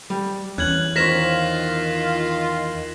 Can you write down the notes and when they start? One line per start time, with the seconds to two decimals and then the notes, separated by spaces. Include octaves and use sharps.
0.10 G3
0.58 E2 C#4 F#6 G#6 F#7
0.96 D#3 F4 A#4 C5 C#5 A#6 B6 E7